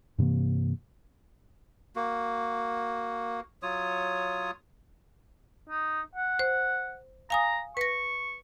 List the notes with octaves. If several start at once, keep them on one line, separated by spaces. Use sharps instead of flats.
G2 C3 E3 A#3
A#3 F#4
F#3 F4 C#5 D#6
D#4
F#5
C5
F5 G#5 A#5 D#6
B4 C#6 A#6